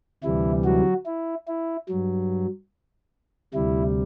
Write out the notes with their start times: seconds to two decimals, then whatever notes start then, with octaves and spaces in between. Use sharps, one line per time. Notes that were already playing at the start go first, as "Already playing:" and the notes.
0.23 D2 C3 E3 G3 E4
0.65 F#3 F#4
1.06 E4
1.48 E4
1.89 G2 F#3
3.54 D2 C3 G3 E4